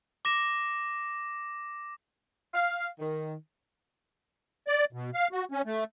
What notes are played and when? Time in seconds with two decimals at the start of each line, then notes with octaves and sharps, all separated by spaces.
0.25 D6 A#6 E7
2.54 F5
2.99 D#3
4.68 D5
4.93 B2
5.14 F5
5.32 F#4
5.52 C#4
5.65 A3